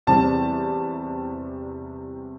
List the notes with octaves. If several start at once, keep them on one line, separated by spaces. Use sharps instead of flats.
E2 C3 G3 C4 A5